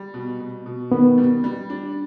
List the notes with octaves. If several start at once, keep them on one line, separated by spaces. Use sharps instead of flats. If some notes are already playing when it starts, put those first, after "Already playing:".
Already playing: G3
B2
B2
B2
D#3 B3
G3
G3
D4